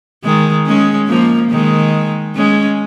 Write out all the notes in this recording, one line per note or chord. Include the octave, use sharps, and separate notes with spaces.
D#3 G#3
G#3 C#4
F3 A#3
D#3 G#3
G#3 C#4